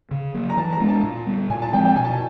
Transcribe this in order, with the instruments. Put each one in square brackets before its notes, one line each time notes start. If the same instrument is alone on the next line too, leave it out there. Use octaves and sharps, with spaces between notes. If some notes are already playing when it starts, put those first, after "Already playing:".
[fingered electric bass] C#3
F#3 A#3
[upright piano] A#5
[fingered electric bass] E3 [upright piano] A5
[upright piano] A#5
[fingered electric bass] G#3 B3 D4
[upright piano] A5
[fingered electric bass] A#2
G3 B3
[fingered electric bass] A#2 [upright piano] G#5
[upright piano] A5
[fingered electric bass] F3 G#3 C4 [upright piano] G5
[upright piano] G5
[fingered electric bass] B2 [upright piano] G#5
[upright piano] A5
G#5